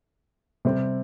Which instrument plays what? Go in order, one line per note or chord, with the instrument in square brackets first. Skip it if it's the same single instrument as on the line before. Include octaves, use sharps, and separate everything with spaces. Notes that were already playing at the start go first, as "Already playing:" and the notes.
[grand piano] C3 G3 C4